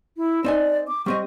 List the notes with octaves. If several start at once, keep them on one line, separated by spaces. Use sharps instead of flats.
E4
C4 D#4 D5 G#5
D6
G3 C4 D#5 C#6